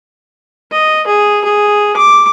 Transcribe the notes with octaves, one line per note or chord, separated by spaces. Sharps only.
D#5
G#4
G#4
D6